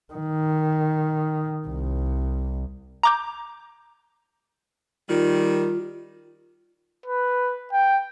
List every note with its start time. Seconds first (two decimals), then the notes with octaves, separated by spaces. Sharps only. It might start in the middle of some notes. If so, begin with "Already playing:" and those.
0.13 D#3
1.68 C2
3.03 A#5 D6 G6
5.09 D#3 G3 F4
7.06 B4
7.73 G5